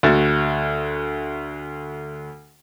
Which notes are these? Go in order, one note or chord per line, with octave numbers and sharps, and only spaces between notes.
D2 F#4 A6